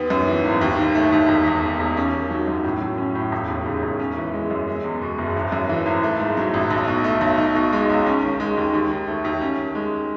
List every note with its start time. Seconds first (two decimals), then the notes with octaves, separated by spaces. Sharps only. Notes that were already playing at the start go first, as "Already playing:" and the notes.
Already playing: D#2 B3
0.10 F#2
0.28 E3
0.44 G#1
0.61 D#2
0.78 D#3
0.95 A3
1.12 D#2
1.29 E1
1.46 E2
1.63 D#3
1.80 E1
1.97 C#4
2.13 D#3
2.31 F#3
2.48 F#2
2.64 A2
2.81 F#3
2.98 C#4
3.15 A2
3.32 E1
3.48 D#2
3.66 C#3
3.83 E1
4.00 C#4
4.17 E3
4.33 G#3
4.50 F#2
4.67 G#3
4.84 E2
5.02 B2
5.18 F#1
5.36 G#1
5.52 F#2
5.69 E3
5.86 G#1
6.03 A3
6.20 G#2
6.37 F#3
6.54 A1
6.70 B1
6.87 B2
7.04 A3
7.21 B1
7.38 D#4
7.55 B2
7.73 G#3
7.89 C#2
8.06 C#4
8.23 D#3
8.40 G#3
8.57 D#2
8.74 D#2
8.91 D#3
9.07 A3
9.24 D#2
9.41 C#4
9.58 D#3
9.75 G#3